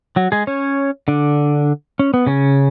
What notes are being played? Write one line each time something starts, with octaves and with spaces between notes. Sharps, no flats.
F#3 F#4
G#3 G#4
C#4 C#5
D3 D4
C#4
B3
C#3 C#4